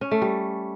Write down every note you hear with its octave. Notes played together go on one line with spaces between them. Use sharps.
C#4
A3
G3